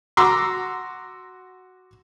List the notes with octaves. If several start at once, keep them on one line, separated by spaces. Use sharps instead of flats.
F#4 A#5 C6 D6 E6